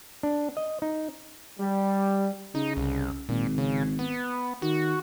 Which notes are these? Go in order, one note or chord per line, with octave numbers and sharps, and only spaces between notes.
D4
D#5
D#4
G3
C#3 D#4
C2
G#1 A#2
C#3
B3
D#3 F#4